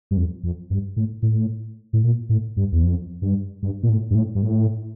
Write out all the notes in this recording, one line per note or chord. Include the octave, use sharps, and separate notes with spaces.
G2
F2
F2
G2
A2
A2
A2
A#2
A2
G2
E2
F2
G2
G2
A#2
A2
G2
A2
G2
A2